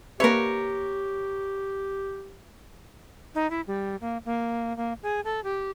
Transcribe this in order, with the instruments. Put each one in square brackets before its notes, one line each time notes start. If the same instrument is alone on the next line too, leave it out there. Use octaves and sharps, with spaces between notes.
[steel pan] A#3 B4 E5 [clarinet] G4 [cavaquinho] A#4 C#5
[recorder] D#4
E4
G3
A#3
A#3
A#3
G#4
A4
G4